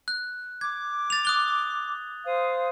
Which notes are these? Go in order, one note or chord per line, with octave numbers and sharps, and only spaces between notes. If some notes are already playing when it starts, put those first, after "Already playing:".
F#6
D6 G#6
A6 F7
D#6 F#6 G7
C5 F5 D#6